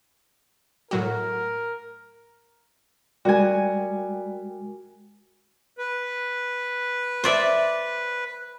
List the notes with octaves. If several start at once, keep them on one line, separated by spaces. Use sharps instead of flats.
A2 F#3 F#4 A#4
G3 G#3 F#4 A#4 G5 G#5
B4
C5 D5 E5